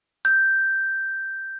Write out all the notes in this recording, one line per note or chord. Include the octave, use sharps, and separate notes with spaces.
G6